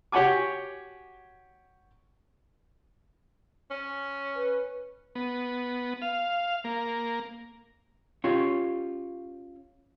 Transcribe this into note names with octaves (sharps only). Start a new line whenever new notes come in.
F#4 G4 C#5 F#5 G#5 D6
C#4
B4
B3
F5
A#3
C#4 F4 G4 C#5